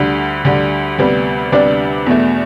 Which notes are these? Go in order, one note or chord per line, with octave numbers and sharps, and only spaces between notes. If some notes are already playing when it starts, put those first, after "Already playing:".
Already playing: D2 D3 G3
D2 D3 G3
D2 C3 G3 B3
D2 C3 G3 B3 D4 D5
E2 B2 A3